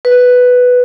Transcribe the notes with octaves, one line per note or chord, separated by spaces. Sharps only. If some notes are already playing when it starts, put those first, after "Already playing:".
B4